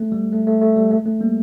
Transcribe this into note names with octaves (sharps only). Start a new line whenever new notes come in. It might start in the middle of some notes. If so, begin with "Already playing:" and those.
Already playing: A3
G3
A3
A3
A3
G3
A3
A3
G3 A#3